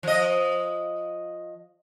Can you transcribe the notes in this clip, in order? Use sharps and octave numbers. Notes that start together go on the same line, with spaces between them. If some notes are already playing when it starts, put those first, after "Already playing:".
F3 D#5